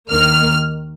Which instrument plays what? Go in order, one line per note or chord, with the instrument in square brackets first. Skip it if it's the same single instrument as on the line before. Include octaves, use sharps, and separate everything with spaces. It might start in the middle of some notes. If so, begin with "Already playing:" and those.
[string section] D#2 D#3 A#3 F6